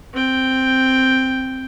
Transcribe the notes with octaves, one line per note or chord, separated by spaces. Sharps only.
C4 G5